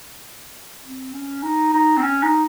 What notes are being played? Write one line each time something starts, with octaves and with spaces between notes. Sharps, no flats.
C4
C#4
D#4
D#4
C4
C#4
D#4